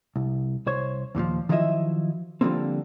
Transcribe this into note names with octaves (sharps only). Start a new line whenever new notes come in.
C2
C2 C5 C#5
D#2 A#2 E3 F3
D#3 F3 F#3 E4 D#5 E5
D3 F3 G3 A#3 C4